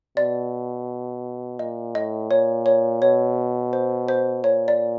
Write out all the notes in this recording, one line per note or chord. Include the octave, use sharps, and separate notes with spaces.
B2 D5
A#2 D#5
A2 D#5
A#2 C#5
C#5
B2 C#5
C5
C5
A#2 C#5
D5